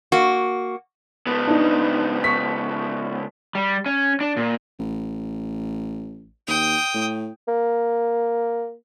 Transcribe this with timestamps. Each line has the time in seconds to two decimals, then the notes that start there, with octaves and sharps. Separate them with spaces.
0.12 A#3 F#4
1.27 C#2 B3
1.47 D4 D#4
2.24 C#6 B6
3.55 G3
3.86 C#4
4.21 D4
4.37 A#2
4.79 A1
6.48 D#2 G5 D#6
6.94 A2
7.48 A#3